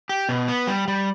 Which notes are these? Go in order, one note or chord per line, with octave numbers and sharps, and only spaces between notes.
G4
B2
B3
G3
G3